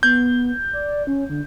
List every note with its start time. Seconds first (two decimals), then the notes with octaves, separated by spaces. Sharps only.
0.03 B3 G6
0.73 D5
1.07 C#4
1.30 D3